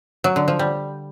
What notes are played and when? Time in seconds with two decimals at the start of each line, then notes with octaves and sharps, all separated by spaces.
0.24 F#3
0.36 D3
0.48 F3
0.59 G3